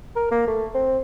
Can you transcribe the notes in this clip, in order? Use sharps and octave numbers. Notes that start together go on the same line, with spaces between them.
A#4
A#3
A3
C4